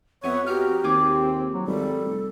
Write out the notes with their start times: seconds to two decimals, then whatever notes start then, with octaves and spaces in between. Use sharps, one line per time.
0.23 F2 B3 C#5 E5 F#5 G#5
0.46 D#4 F#4 G4 A#5 F6
0.84 D#2 C4 F4 G#4 D6
1.54 F#3
1.67 G#1 G3 A4
2.05 F1